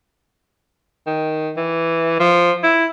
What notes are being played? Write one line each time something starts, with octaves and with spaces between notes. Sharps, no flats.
D#3
E3
F3
E4